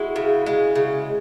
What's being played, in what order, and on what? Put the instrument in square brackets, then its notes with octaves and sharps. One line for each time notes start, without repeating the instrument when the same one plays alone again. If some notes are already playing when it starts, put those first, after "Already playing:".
Already playing: [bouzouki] G#3 E4 F#4
C#3
G#3
C#3